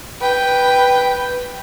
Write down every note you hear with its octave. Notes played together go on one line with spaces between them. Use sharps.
B4 G5